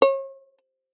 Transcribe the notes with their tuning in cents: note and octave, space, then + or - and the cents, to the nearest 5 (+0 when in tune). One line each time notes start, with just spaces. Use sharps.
C#5 -40